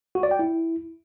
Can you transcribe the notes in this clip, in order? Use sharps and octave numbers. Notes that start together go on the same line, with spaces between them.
F#4
D5
G5
E4